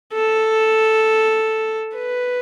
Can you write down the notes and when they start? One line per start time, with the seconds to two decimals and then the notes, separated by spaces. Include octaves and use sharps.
0.13 A4
1.96 B4